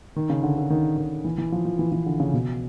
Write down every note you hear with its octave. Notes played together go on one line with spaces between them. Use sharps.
D#3
C#3
D3
D3
D#3
D#3
E3
E3
F3
F3
E3
E3
D3
C#3
B2